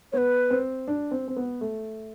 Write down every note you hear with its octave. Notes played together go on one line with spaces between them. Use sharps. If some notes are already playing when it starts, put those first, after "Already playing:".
B3 B4 C#5
C4
D4
C4
C4
B3
A3